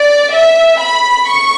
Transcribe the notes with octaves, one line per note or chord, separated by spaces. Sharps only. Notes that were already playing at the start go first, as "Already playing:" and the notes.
Already playing: D5
E5
B5
C#6